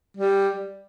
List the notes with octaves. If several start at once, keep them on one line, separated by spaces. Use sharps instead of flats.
G3